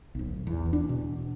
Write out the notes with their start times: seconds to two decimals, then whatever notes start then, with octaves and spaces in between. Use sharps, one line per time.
0.15 D1 B1
0.47 E2
0.73 D4
0.89 B2